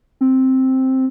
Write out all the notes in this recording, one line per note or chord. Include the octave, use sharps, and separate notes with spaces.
C4